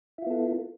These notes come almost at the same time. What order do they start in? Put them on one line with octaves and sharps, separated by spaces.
E4 F4 B3 A4